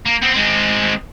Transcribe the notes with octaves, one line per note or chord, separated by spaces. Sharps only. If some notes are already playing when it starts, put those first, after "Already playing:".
A#3
B3 C4
G#3 C4